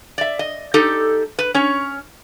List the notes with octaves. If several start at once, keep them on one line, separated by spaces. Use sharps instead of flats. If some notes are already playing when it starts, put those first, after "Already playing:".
D5 E5
D#5
D#4 G4 A4
B4
C#4 C#5